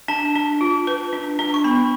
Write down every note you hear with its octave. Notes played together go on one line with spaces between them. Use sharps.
D4 A5
D4
F4
B4
D4
D4
C#6
B3 B5